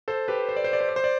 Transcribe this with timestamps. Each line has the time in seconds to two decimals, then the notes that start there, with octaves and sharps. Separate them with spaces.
0.08 A4 C5
0.28 G4 B4
0.49 C5
0.56 D5
0.64 C5
0.73 D5
0.81 C5
0.89 D5
0.96 C5
1.04 D5